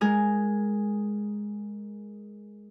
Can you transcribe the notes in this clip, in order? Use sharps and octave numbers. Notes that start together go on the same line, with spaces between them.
G#3 G#4 A#4